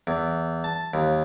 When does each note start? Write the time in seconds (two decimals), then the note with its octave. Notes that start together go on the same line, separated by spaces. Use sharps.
0.07 E2
0.64 A5
0.94 D#2